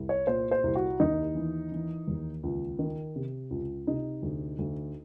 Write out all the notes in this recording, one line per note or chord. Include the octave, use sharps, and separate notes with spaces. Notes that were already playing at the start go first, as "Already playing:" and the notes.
Already playing: C2
C#5
A#2 C5
C5
C2
F#4
D#2 D#4
E3
E3
D#2
C#2
D#3
C3
C#2
C3 D#4
D2
D2